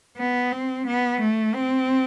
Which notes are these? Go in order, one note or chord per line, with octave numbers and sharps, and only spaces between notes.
B3
C4
B3
A3
C4